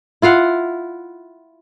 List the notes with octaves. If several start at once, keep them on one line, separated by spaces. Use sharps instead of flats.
E4 F4 F5 F#5